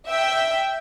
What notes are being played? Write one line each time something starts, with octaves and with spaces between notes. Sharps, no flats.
E5 G5